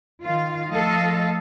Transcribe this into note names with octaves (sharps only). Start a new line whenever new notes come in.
D#3 F4 F5
F3 A3 A4 D#5 F5